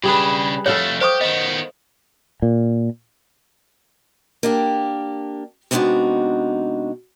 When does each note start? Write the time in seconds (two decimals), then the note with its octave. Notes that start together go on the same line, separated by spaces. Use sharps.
0.04 C#3 G3 D4 G#4 B4
0.66 F2 A3 A4 C#5 F5 F#5
1.01 G4 C5 C#6 D#6
1.21 D#3 B3 D#5
2.42 A#2
4.43 A#3 D4 G4
5.71 C3 G#3 B3 D4 D#4 F#4